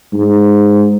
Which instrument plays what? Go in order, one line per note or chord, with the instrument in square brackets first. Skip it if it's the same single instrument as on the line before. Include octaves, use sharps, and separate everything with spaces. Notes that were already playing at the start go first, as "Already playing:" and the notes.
[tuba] G#2